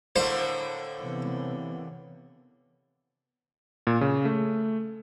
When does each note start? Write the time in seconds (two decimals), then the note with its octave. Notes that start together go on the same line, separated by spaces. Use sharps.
0.16 A2 D3 A#3 C5
1.00 C3 E3 B3
3.87 A#2
4.01 C#3
4.25 A3